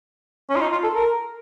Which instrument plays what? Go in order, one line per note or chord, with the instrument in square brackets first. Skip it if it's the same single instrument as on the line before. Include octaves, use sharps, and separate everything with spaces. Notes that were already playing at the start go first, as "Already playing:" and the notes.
[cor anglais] C#4
F4
D#4
F4
A4
A#4